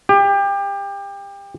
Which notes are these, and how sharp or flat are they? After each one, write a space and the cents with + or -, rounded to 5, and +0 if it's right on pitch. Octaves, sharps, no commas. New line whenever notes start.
G4 +25